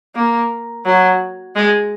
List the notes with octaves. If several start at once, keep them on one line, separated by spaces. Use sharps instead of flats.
A#3
F#3
G#3